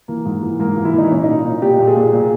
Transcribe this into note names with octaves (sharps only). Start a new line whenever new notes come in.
E3 A#3
G#2
E3
G#2 A#3
E3
E4
E3 D#4
A#2 C#4
A#2 D#4
A#2
A#2 G4
A#2
G#4
A#2
A#2